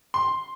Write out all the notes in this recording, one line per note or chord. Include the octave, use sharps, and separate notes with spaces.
C6